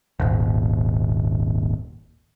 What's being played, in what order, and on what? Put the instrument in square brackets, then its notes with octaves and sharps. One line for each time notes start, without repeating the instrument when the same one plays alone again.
[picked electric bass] D#1 G#1